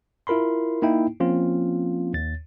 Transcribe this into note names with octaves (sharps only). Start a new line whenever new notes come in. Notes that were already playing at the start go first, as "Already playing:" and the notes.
E4 F4 A#4 B5 C6
A#3 D#4 E4 G5
F3 A#3 C4 C#4 F4
D#2 A6